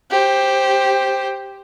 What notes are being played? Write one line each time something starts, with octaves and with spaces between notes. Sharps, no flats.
G4 C5